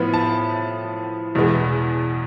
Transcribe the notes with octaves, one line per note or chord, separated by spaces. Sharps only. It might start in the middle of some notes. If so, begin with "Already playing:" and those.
Already playing: A2 F3 B3 B5
A5
E2 B2 G#3 B3